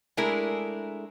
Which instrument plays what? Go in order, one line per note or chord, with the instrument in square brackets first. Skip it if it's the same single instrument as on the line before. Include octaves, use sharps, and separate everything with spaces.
[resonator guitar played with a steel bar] G#3 A3 D4 E4 G#4 A#4